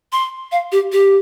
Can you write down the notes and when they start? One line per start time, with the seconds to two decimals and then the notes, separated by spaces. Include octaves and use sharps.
0.12 C6
0.52 F5
0.72 G4
0.92 G4